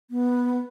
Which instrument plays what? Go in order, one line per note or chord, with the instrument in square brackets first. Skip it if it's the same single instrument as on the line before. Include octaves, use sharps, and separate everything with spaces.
[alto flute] B3